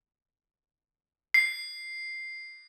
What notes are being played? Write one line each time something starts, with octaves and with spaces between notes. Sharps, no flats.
C7